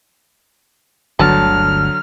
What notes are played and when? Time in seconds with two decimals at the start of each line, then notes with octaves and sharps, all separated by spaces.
1.19 G1 D2 D3 F#3 A5 F6